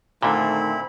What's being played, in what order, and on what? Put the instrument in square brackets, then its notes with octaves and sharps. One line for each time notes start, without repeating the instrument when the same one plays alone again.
[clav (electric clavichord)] A#2 D3 [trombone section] D#3 A3 [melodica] C4 E4 B5